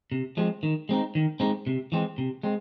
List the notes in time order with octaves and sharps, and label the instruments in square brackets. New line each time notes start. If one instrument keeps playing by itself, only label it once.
[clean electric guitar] C3
F3 G#3 C4
D#3
G#3 C4 D#4
D#3
G#3 C4 D#4
C3
E3 G#3 C4
C3
G#3 C4